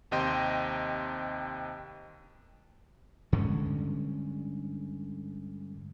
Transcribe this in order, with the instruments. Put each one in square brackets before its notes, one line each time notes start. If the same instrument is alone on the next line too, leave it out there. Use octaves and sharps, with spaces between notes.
[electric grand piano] D#2 C3 D#5 G5 C6
[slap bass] G2 D3 G#3 C#4